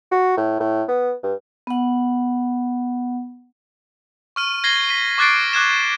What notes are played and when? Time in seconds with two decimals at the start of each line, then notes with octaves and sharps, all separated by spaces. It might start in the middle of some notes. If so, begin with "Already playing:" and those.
0.12 F#4
0.37 A2
0.60 A2
0.88 B3
1.23 G2
1.67 B3 F#5
4.36 C#6 F6 D#7
4.64 G#6 A#6 C7 G7
4.89 B6 D#7
5.18 C#6 D6 F#6 A6 C7 D7
5.53 D6 F#6 G#6 E7